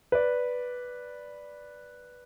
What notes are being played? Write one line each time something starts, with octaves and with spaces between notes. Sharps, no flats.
B4 D5